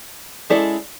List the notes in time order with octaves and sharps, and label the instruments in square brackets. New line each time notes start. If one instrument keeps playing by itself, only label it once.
[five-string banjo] G#3 C#4 E4 A4 D5